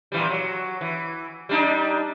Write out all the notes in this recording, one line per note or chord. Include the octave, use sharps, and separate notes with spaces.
A#2 E3 G3
F#3
E3
G3 D4 D#4